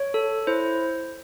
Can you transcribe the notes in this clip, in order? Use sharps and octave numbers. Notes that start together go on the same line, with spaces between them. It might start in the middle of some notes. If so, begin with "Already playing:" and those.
Already playing: C#5
A4
E4 C5